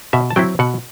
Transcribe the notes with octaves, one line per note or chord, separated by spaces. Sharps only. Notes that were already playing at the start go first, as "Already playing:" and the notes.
B2 E5
A5
F#3 C4 E4 G5
B2 F#5